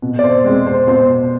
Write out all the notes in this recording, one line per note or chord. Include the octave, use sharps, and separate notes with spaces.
B2
D5
C5
G#3 C4
C5
B2 C5